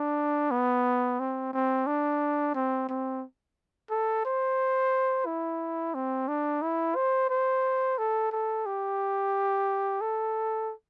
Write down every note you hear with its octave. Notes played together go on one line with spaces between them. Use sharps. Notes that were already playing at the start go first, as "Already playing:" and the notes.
Already playing: D4
B3
C4
C4
D4
C4
C4
A4
C5
E4
C4
D4
E4
C5
C5
A4
A4
G4
A4